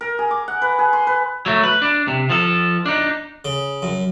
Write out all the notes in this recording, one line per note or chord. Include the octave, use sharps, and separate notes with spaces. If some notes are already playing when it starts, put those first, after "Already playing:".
A#4
G#4
D6
F#5
B4
G#4
C6
B4
F#3 A3
B4
D4
C3
F3 A4
D4 D#4
C#3
F#2